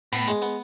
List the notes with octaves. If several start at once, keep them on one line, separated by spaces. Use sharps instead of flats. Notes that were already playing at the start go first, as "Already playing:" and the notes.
A2 B3
G#3
B3